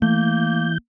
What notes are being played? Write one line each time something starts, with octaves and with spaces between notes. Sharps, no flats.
E3 A3 A#3 G6